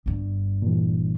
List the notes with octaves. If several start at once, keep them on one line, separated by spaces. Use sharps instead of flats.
G1 G2
A#2 E3